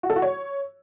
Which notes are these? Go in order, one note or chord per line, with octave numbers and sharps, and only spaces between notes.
F#4
A4
F#4
C#5